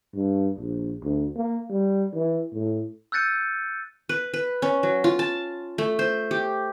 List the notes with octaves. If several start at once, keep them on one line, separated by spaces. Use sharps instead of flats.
G2
A#1
D2
A#3
G3
E3
A2
E6 F#6 G6 A6 C#7 D#7
B4
B4
C#4
F#3
F4
A5
A3
C5
G4